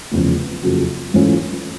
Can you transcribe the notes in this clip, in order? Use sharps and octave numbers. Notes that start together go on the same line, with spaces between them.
F1 E2 C#3 F3
F#1 F2 C#3 F#3
G#2 E3 A3 C#4 F4